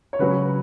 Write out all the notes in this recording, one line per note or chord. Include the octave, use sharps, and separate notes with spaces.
C#5
C#3 F#3 C#4 B4